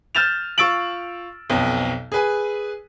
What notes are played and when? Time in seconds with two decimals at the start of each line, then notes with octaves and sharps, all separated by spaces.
0.15 F6 G6 A6 E7 F7
0.58 F4 C#6 E6 A6 D7 F#7
1.50 B1 F2 B2
2.12 G#4 B4 G#5